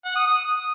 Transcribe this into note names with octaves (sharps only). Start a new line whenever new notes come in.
F#5
D#6
D#6